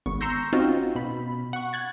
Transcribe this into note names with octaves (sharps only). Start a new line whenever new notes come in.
G#1 B3 C#6
A#5 C6 C#6 E6 G6 A#6
C4 C#4 D#4 F4 F#4
B2 B5
F#5 C#6
F#6 G#6 A6